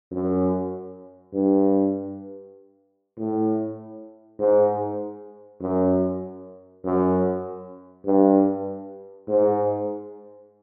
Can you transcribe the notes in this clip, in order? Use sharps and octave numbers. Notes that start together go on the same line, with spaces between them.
F#2
G2
A2
G#2
F#2
F#2
G2
G#2